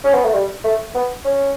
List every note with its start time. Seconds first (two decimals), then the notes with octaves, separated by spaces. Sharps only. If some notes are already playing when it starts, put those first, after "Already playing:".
0.04 C#4
0.14 B3
0.25 A3
0.34 G3
0.64 A3
0.95 B3
1.25 C#4